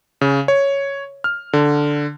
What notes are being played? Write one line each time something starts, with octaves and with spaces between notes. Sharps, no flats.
C#3
C#5
F6
D3